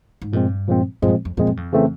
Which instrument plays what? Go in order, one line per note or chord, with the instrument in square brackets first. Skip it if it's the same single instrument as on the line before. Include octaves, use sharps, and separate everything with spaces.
[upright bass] G#2
[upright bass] G2 [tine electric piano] A#2 F3 G#3 C4
[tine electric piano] A#2 F3 G#3 C4
[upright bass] G2 [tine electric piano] A#2 F3 G#3 C4
[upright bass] F2
[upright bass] F2 [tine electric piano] A#2 F3 G#3 C4
[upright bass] F#2
F2
[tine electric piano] C#3 E3 A3 C4